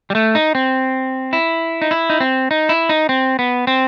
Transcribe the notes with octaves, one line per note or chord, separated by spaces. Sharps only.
G3
A3
D#4
C4
E4
D#4
E4
D#4
C4
D#4
E4
D#4
C4
B3
C4